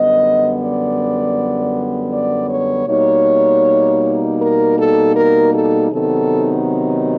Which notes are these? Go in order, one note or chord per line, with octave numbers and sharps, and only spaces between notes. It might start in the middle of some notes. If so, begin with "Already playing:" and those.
Already playing: F#2 D3 G3 B3 D#5
D5
D5
C#5
B2 G3 A#3 D#4 C#5
A#4
A4
A#4
A4
C3 D#3 F#3 B3 D#4 A4